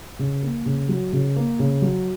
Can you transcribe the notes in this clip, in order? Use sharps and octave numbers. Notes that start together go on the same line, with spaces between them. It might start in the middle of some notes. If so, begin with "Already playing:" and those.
C#3
A#3
C#3
F#3
C#3
A#3
C#3
F#3